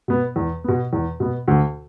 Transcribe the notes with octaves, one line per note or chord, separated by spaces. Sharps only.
B2 B3
E2
B2 B3
E2
B2 B3
D2